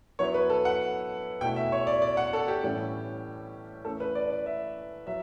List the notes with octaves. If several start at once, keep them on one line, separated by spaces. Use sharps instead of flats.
F#3 B3 E4 C#5
B4
A4
F#5
B2 A3 E4 G5
E5
C#5
D5
D5
F#5
A4
G4
A2 E3 G3 C#4
E3 A3 C#4 E4 A4
B4
D5
D5
E5
F#3 E4 E5